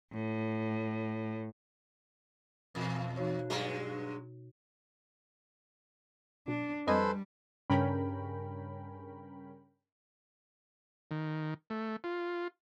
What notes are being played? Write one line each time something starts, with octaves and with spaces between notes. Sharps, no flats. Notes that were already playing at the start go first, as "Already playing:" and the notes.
A2
E2 B2
D#4 F#4 C#5
G2 F#3 G#3
B1 D4
F2 G3 A4 B4 C5 D#5 G#5
G2 C#3 C#4 A#4 G5 B5
D#3
A3
F4